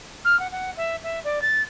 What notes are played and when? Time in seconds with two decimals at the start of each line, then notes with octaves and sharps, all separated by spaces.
0.25 F6
0.39 F#5
0.52 F#5
0.77 E5
1.03 E5
1.24 D5
1.42 A6